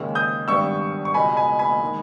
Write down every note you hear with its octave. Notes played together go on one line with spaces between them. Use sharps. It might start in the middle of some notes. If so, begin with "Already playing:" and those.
Already playing: D#2 C#3 G#3 C#4 E6
D#6 G6
G#1 G2 G3 B3 C#6 E6
C#6
C#2 B2 G#3 G#5 B5
G#5 B5
G#5 B5
D#3 G#3